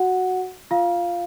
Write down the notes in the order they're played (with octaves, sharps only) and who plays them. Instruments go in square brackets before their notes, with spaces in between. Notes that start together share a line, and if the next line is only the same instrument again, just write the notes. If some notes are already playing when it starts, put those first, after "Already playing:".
Already playing: [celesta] F#4 F#5
F4 F5